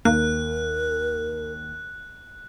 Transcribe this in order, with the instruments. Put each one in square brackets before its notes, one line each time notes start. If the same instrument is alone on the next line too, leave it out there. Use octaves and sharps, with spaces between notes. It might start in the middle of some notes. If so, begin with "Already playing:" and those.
[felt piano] D#2 [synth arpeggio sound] A#3 [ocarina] A#4 [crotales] F#6